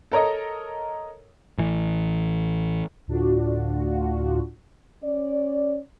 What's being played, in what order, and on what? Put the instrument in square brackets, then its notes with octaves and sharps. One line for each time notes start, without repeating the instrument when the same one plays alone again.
[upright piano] A4 A#4 C#5 D#5
[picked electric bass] A1 E3
[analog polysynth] D2 A2 D4 F4 F#4
[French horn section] C#4 D5